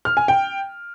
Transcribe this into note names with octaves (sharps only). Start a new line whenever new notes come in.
F6
G#5
G5